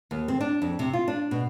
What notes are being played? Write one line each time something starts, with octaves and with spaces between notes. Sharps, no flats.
D#2
C4
D4
F2
C3
F4
D4
B2